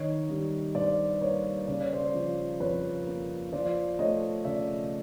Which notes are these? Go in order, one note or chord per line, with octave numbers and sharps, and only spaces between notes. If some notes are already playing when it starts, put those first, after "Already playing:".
Already playing: D#3 C#5 D#5
G3
G2 C5 D5
A#3 B4 C#5
C#3 D5
C#5
C5 D5
F3
F2 B4 C#5
A#3
F3 C5 D5
A3 C#5 D#5
C#3 D5 E5